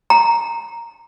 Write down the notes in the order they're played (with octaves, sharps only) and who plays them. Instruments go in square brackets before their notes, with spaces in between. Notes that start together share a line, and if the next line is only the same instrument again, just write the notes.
[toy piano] A#5